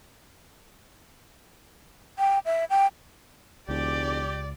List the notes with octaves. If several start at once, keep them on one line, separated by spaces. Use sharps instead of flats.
G5
E5
G5
E1 C#2 G4 D5